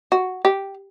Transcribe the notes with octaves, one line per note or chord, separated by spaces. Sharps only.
F#4
G4